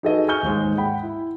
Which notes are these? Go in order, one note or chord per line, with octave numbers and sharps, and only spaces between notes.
D#4 F#4 G#4 A4 B4 D#5
G#5 C#6 F6 G6 G7
D#2 G#2 G#3
F#5 G5 B5
E4